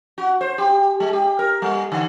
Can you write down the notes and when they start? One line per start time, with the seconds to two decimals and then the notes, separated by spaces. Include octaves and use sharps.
0.18 F#4
0.41 C5
0.58 G4
1.00 G#3
1.13 G4
1.39 A#4
1.62 G3
1.92 D3